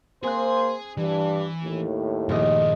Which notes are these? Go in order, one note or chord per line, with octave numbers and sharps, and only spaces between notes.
A#3 C4 G#4 C5 G#5 F#6
G2 E3 D4
D#2 A2
A#1 G2 D#3 A3 D#5